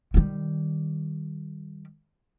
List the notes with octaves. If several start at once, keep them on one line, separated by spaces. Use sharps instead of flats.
D#3 G3